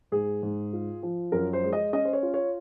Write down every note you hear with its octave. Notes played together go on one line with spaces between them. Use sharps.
G#2 G#4
G#2
F4
F3
F#2 A#4
C5
G#3
D#5
C#4 D#5
C5
C#5
F4
C#5